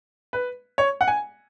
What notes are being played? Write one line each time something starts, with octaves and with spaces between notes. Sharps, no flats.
B4
C#5
F#5
G#5